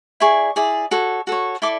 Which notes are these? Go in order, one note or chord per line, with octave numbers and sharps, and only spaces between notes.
E4 G#4 D5 C#6
E4 G#4 D5
F#4 A4 C#5
F#4 A4 C#5
E4 A4 D5 D6